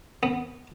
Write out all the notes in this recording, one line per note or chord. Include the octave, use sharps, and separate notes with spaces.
B3